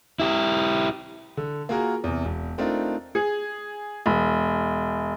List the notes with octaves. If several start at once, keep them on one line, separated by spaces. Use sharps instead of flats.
E4 G4
D3
A#3 F4 F#4 G#4 A#4
E2 C3
E1
A3 C4 D4 D#4 F4 A#4
G#4
E1